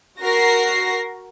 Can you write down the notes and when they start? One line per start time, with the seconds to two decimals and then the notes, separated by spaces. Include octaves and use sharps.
0.20 F#4 A#4 A#6 C7